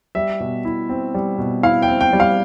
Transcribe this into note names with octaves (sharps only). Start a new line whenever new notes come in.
G3 E5
B2
E4
C4
G3
B2
E4 F5
G5
C4
G5
G3
F5